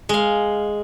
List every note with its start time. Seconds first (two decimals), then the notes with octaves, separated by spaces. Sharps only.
0.09 G#3 F5